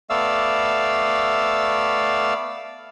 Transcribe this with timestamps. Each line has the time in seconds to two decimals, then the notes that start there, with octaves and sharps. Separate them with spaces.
0.10 A3 B3 D5 F5 E6